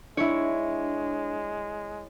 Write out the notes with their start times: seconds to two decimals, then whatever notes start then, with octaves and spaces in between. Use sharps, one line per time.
0.17 G#3 D4 E4 C#5